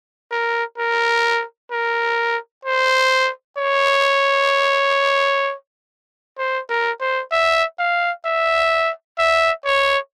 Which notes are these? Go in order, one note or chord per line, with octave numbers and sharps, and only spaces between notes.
A#4
A#4
A#4
C5
C#5
C5
A#4
C5
E5
F5
E5
E5
C#5